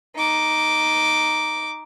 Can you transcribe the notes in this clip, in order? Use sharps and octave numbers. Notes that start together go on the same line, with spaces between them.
D#4 D6